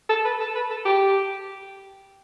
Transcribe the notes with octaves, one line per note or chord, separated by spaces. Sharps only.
A4
B4
A4
B4
A4
G4